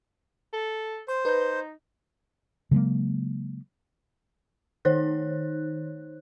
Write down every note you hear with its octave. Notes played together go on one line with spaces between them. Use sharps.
A4
C5 C6
D#4 B4 G6
C#3 F#3 G#3 A#3
D#3 D#4 C5 C#5 F#6